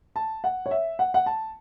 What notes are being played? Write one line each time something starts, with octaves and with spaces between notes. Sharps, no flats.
A5
F#5
C#5
E5
F#5
F#5
A5